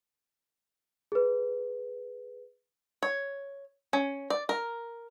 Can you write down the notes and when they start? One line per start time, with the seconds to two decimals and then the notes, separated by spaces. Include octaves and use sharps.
1.12 G#4 B4
3.03 C#5
3.93 C#4
4.30 D5
4.49 A#4